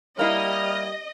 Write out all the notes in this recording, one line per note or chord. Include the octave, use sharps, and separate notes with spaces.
G3 A#3 E4 D#5 F6